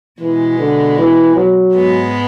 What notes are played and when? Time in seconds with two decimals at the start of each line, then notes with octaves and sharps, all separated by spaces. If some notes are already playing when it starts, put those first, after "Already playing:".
0.20 B2 E3 G#3 B3
0.59 D3
0.98 E3
1.36 F#3
1.75 G#2 G#3 B3